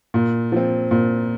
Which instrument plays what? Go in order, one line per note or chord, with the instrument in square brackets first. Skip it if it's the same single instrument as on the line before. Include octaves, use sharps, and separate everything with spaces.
[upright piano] A#2
F3 C4
A#2